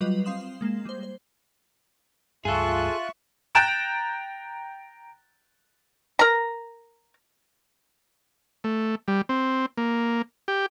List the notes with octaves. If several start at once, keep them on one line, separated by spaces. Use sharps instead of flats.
F#3 G3 F4 B4 D#5
C4 F5 C6 D#6 E7 F#7
G#3 A#3 C7 E7
G3 C5
C5
C#2 G2 F4 G#4 A4 E5 C#6 F#6
G5 A#5 F#6 A6 D7 E7
A#4 A#5
A3
G3
C4
A#3
G4